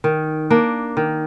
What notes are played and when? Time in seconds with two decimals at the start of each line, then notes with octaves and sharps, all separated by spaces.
0.04 D#3
0.50 A#3 D4
0.97 D#3